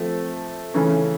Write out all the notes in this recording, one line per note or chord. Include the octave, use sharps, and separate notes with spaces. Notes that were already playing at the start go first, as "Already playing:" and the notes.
Already playing: F3 A3 C4
C#3 E3 A3 C#4